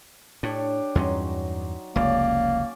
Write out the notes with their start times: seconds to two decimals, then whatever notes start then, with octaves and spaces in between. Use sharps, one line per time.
0.43 A2 D4 G4 C#5
0.95 E2 G2 F#3 C#4 D#4 C6
1.96 F1 C#2 A#3 C#4 D5